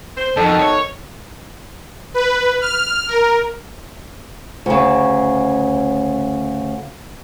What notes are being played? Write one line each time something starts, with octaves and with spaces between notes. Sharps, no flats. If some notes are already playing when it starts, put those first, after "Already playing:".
C5
F2 B2 D#3 A4
C#5
B4
F6
A#4
D2 C#3